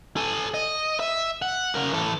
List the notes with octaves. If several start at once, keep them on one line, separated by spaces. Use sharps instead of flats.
A4 G#5
D#5
E5
F#5
C#3 A#4
E3 A4